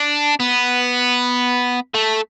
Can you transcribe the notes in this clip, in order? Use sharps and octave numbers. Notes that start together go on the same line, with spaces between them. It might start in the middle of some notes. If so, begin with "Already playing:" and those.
Already playing: D4
B3
A3